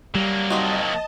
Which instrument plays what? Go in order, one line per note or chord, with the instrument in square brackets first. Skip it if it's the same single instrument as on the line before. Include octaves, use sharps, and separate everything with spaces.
[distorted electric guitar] F#3 A#3 [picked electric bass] G3
[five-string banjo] C4 D#4 F#4 [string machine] D#5 A5